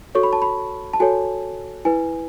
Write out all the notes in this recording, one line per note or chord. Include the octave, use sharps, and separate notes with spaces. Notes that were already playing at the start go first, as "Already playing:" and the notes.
F#4 A4 C#5 C#6
B5
A5
B5
A5
F#4 A4 C#5 G#5
E4 B4 G#5